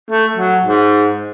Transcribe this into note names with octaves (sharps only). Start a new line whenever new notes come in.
A3
F#3
G#2